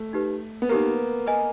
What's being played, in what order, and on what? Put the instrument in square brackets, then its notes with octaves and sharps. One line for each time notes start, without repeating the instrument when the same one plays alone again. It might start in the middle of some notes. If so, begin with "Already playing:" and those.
Already playing: [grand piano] A3
[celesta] D#4 G4 B4
[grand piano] B3
[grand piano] A#3 [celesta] D#4 G4 B4
[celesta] B4 D#5 G#5